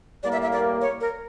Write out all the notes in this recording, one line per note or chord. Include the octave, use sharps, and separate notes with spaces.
A2 G3 A#3 D5
E5
E5
D5
C#5
A#4